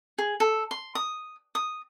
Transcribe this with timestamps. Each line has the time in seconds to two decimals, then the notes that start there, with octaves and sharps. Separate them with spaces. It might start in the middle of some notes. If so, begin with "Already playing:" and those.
0.18 G#4
0.40 A4
0.71 C6
0.95 D#6
1.55 D#6